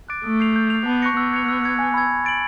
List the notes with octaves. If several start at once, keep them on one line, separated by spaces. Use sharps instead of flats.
D6 F#6 A6 D7
A3 D#6
G6 C7 F7
G6
C7 F7
B3 A5
C#6 F#6 A#6 C#7
B3 E6
G#6 C#7 F7
E6
G#6 C#7
G#5
B5 E6 G#6
E6
A6 D7 F#7